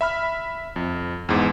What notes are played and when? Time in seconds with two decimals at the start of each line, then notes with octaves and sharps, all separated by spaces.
0.01 E5 B5 F6
0.76 F2
1.29 E2 G#2